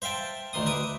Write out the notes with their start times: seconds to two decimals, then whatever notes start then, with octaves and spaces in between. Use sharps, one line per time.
0.02 C5 E5 F5 G5 A5
0.53 D2 D#3 C6 D#6
0.66 B4 E5 D6 D#6